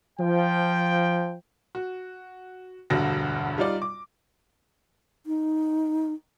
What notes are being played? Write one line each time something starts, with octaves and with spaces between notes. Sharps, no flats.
F3 G5
F#4
E1 D2 G2 D3 F#4 A#6
G3 D#4 F4 D5
D6
D#4